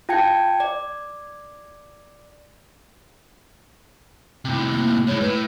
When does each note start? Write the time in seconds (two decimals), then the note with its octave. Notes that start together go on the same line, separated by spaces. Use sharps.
0.09 F4 G5 A5 G#6 C#7
0.60 D5
4.45 A2 C3
4.72 A#3
5.07 A2 G#3 C#5
5.21 A2 B4